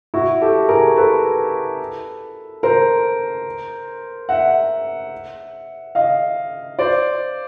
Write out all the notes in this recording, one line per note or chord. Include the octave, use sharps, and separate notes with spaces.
E4 F#4
G4 A4
G#4 A#4
A4 B4
A#4 C5
E5 F#5
D#5 F5
C5 D5